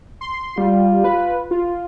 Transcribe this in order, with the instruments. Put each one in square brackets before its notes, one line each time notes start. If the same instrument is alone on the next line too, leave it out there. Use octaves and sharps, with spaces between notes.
[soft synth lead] C6
[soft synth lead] G3 [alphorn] F4
[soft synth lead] B4
F4